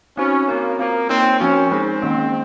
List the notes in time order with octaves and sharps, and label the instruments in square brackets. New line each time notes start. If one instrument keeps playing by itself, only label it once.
[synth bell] C4 D#4 F#4 C5 [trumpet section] C#4
[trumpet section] A#3 [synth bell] C4 F#4 C#5
[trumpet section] A#3 [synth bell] C4 F4 C5
[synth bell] A#3 D#4 A#4 C#5 [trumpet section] C4
[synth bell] F3 C4 F#4 A#4 [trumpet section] C#4
[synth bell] G#3 D#4 G#4 [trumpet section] C4
[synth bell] D#3 A#3 C#4